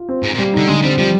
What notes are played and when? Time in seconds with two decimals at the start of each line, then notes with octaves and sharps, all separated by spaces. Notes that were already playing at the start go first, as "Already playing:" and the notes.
Already playing: F4
0.09 C4
0.23 G#2 C4
0.34 A#2
0.38 G3
0.53 D3 D#4
0.68 D3 G#3
0.83 G3 C4
0.98 F3 G3